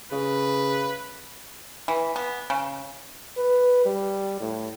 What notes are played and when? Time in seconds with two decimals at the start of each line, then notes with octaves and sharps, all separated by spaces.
0.12 C#3 B4
1.88 E3
2.16 B3
2.50 C#3
3.37 B4
3.85 G3
4.40 A2